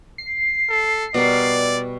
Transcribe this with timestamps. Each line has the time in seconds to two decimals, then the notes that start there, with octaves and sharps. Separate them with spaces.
0.18 C7
0.69 A4
1.14 B2 G3 A#4 D5